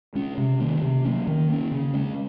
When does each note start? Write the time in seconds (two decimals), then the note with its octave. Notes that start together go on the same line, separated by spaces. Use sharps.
0.15 G#3 C#4
0.38 C3
0.60 D#3 A#3 C#4
0.82 C3
1.05 F#3 A#3 C#4
1.27 D#3
1.49 A#3 C#4
1.72 C#3
1.94 G#3 C#4